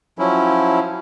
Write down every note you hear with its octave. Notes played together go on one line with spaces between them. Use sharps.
F3 F#3 C#4 E4